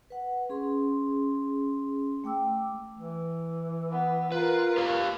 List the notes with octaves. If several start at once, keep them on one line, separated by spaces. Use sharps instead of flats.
B4 F#5
C#4 G#4 C6
A3 G5 D6 E6
E3
B3
F4 A#4 B4
G4 C#5 F5